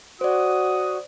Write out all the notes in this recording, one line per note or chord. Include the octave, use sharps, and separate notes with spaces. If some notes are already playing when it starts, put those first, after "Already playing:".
F#4 C5 D5 D#6